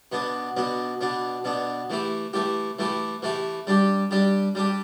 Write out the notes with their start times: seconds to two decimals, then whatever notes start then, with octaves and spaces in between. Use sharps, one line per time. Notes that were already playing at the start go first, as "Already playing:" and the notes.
0.12 B2 B3 D4
0.57 B2 B3 D4
1.01 B2 B3 D4
1.44 B2 B3 D4
1.90 E3 A3 E4 G4
2.33 E3 A3 E4 G4
2.79 E3 A3 E4 G4
3.23 E3 A3 E4 G4
3.67 G3 D4 G4
4.11 G3 D4 G4
4.55 G3 D4 G4